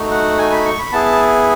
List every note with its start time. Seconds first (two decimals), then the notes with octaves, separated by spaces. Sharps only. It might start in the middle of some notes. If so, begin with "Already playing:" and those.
Already playing: A3 D#4 F#4
0.11 F#5
0.38 G#5
0.51 B5
0.65 C#6
0.79 B5
0.92 B3 E4 G#4 A5